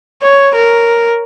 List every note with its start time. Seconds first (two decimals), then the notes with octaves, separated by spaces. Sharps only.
0.22 C#5
0.54 A#4